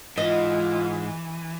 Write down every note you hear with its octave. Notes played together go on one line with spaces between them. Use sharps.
G#2 E3 F4 D#5